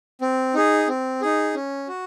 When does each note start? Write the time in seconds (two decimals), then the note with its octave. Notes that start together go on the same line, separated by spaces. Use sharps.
0.21 C4
0.54 D#4 G#4
0.88 C4
1.22 D#4 G#4
1.54 C#4
1.88 F#4